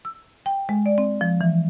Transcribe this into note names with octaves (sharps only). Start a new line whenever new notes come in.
E6
G5
G#3
D5
C4
F3
E3